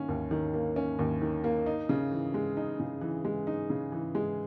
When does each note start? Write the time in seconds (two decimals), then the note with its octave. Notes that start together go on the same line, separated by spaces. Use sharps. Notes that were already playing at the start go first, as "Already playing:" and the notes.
Already playing: D#3 A#3 C#4
0.09 D#2
0.31 D#3
0.54 A#3
0.76 C#4
0.99 D#2
1.22 D#3
1.44 A#3
1.66 D#4
1.89 C#3
2.12 E3
2.34 G#3
2.57 D#4
2.80 C#3
3.01 E3
3.25 G#3
3.47 D#4
3.70 C#3
3.92 E3
4.15 G#3